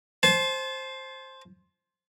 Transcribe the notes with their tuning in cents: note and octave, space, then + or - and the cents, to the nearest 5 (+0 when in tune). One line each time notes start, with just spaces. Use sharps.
C5 +10 A5 -35